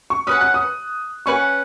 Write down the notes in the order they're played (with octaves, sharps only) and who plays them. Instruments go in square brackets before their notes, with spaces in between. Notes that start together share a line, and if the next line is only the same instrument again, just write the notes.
[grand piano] C#6
[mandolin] C#4 B4 F#5 [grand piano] D#6
[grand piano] F#6
D#6
[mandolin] C#4 B4 F#5 [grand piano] C#6